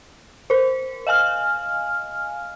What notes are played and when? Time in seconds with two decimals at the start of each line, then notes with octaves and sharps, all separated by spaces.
0.50 A#4 C5
1.07 D#5 F5 G#5 F6